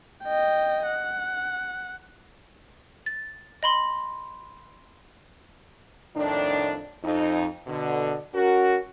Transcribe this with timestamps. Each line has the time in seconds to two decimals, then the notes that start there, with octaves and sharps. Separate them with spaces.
0.24 D#5 G5
0.87 F#5
3.06 A6
3.63 D#5 B5 C6
6.16 F2 A2 D#3 D4
7.03 F2 D#4
7.67 B2 D3
8.34 C#4 F#4 A#4